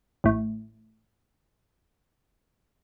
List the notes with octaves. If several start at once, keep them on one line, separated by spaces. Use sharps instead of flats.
A1 A2